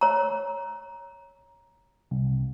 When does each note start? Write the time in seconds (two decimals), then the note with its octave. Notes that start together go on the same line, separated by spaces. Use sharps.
0.01 C#5 A#5
2.11 C2